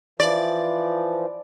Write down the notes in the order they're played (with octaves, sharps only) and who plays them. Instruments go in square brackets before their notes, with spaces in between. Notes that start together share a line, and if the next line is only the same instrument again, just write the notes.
[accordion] E3 F3 [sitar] D5